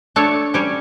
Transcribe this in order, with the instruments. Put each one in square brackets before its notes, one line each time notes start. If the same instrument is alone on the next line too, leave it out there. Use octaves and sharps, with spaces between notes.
[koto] A3 D4 A4 C#5
G3 C#4 G4 C#5